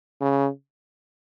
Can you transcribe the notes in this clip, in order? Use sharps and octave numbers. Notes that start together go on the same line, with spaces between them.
C#3